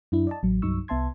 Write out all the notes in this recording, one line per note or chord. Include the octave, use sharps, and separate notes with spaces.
F#2 D4 E4
D5 D#5 A5
A1 F#3
C2 G2 F#3 D#4 C#6 E6
C2 B3 E5 A5 C6 G#6